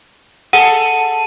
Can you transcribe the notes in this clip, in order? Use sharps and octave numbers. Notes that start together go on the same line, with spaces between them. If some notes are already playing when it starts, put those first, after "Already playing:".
G#4 A4 F#5 D#7